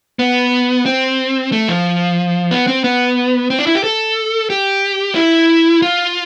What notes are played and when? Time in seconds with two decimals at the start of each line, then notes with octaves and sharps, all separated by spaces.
0.19 B3
0.86 C4
1.52 A3
1.68 F3
2.51 B3
2.67 C4
2.84 B3
3.50 C4
3.59 D4
3.67 E4
3.75 G4
3.84 A4
4.50 G4
5.15 E4
5.82 F4